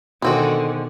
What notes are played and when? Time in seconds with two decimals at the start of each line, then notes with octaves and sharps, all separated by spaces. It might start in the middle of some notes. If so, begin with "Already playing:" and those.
0.22 B2 D3 D#3 G#3 C4 F#4